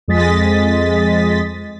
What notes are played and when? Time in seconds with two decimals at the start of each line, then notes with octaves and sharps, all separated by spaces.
0.08 F2 G#3 D#5 A6 B6